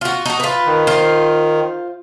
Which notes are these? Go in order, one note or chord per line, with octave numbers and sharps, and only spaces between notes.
F4 F#4
D#4 F#4
F4 B4
D#3
F4 C5